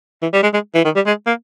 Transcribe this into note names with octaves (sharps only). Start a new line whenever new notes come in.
E3
G3
G#3
G#3
E3
D#3
G3
G#3
A#3